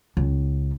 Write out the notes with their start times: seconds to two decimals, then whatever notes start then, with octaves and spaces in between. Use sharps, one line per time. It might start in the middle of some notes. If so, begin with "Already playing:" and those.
0.17 C#2